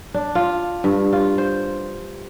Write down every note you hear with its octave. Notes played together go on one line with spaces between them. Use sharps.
D4
F4
G2
F4
C5